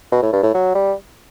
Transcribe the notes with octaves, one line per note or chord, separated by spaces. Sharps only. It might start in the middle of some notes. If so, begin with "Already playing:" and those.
B2
A2
G2
A2
F#3
G3